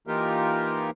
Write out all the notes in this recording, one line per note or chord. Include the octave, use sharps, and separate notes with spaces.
E3 A#3 D#4 F4 G4 A#4